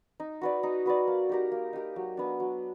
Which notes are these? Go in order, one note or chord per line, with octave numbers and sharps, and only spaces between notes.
D#4
F#4 B4 D5
D#4
F#4 B4 D5
A#3
D#4 G4 A#4
A#3
D#4 G4 A#4
F#3
B3 D4
F#3